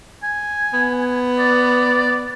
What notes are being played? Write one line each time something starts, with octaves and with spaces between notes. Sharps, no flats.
G#5
B3
D5